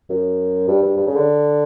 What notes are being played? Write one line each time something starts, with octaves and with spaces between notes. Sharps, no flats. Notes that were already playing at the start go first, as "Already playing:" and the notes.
F#2
G2
G2
G2
C#3
D3